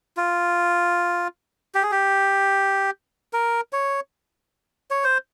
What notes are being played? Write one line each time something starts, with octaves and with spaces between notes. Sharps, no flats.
F4
G4
G#4
G4
A#4
C#5
C#5
C5